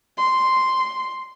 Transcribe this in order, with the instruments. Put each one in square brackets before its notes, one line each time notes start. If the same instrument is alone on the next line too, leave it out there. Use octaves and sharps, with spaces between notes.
[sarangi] C6